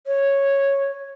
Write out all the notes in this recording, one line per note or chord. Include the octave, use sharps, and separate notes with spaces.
C#5